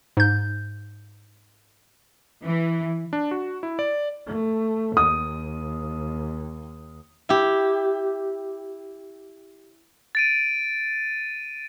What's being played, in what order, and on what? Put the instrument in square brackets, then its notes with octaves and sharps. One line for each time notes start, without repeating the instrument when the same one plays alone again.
[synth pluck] G#2 G6
[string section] E3
[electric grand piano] D4
F#4
E4
D5
[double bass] A3
[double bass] D#2 [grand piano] D#6
[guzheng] E4 G4
[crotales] A6 D7 D#7